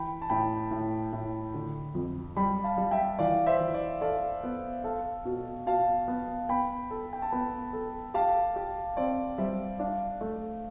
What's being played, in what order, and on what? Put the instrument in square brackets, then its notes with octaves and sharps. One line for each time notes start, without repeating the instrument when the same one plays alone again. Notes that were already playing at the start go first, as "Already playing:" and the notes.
Already playing: [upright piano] E3 [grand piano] G5 B5
[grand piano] A5
[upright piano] A2 [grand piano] G5 B5
[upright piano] A2
A2
D3
F2
[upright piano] G3 [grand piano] G5 B5
[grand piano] F5 A5
[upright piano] G3
[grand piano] E5 G5
[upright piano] E3 [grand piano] D5 F5
[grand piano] C5 E5
[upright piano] E3
[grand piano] D5
[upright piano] A4 [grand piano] D5 F5
[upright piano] B3
[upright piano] A4 [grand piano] F5 A5
[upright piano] B2
[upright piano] B2 [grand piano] F5 A5
[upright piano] B3
[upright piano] B3 [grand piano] G5 B5
[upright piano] A4
[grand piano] G5
A5
[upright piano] B3 [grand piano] G5 B5
[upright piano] A4
[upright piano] G4 [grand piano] F5 A5
[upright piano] G4
[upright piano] C4 [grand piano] D5
[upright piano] G3 [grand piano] C5 E5
[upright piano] D4 [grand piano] D5 F5
[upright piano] A3